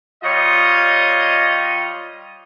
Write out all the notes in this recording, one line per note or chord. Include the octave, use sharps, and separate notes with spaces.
G3 F4 C#5 D#5